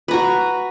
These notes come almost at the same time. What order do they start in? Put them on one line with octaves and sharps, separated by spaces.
B4 A#5 F#4